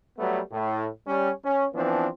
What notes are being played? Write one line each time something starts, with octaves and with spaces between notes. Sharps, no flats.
F#3 G3 A3 B3
A2
G3 C#4
C#4
E3 F3 B3 C4 D4